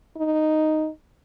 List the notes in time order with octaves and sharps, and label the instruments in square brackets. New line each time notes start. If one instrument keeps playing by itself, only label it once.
[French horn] D#4